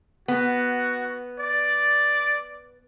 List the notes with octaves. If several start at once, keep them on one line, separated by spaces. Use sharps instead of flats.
B3 F#4
D5